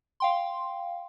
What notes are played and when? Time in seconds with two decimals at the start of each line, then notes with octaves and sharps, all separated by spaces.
0.20 F5 G5 C6